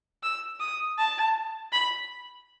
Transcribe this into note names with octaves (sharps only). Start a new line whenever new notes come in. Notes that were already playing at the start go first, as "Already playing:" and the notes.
E6
D#6
A5
B5